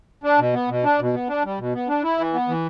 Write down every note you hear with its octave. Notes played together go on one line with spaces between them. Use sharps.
D4
B2
B3
B2
D4
B2
B3
D4
G3
B2
B3
D4
E4
E3
B3
E3